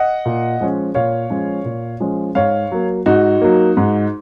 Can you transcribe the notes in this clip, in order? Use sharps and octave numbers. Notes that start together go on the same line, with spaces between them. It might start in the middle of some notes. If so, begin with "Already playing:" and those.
Already playing: D#5 F#5
A#2
F3 G#3 C#4
A#2 C#5 F5
F3 G#3 C#4
A#2
F3 G#3 C#4
G#2 C#5 F5
F#3 A#3
G#2 D#4 F#4
F#3 A#3
G#2